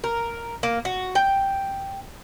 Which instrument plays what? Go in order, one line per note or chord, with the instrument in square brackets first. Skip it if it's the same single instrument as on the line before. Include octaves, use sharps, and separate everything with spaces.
[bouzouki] A#4
A#3
F#4
G5